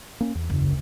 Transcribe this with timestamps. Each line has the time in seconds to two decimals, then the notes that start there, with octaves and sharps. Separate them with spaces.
0.21 A#3 C#4
0.35 E2
0.50 F#1
0.65 D2